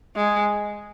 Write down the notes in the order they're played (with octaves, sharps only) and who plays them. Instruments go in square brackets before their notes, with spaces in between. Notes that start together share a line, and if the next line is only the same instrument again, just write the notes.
[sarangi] G#3